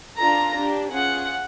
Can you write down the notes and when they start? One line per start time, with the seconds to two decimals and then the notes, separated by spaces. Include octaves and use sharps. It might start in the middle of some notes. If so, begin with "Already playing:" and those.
0.18 D4 F4 A4 A#5
0.54 D4 G4
0.91 C#4 F4 G#4 F#5